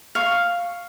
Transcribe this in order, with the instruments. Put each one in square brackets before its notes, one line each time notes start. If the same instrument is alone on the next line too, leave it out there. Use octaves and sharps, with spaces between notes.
[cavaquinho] F5 C#6